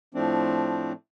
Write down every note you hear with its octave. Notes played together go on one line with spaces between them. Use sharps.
A2 F3 A3 C4 D4